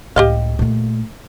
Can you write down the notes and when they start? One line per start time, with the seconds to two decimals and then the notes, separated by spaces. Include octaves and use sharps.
0.16 C#2 A2 G4 D#5 F5
0.59 A#2 A3